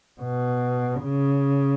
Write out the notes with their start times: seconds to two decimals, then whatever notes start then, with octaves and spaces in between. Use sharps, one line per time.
0.21 B2
1.02 C#3